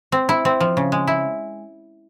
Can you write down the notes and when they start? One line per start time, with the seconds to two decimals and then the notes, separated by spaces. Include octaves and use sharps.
0.12 C4
0.29 E4
0.45 C4
0.60 F3
0.77 C#3
0.92 G#3
1.07 E4